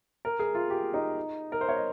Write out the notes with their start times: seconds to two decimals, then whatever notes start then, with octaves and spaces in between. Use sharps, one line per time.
0.25 A#4
0.39 G#4
0.55 F4
0.70 G4
0.94 D#4
1.52 A#4
1.61 C5
1.69 C#5
1.77 D#5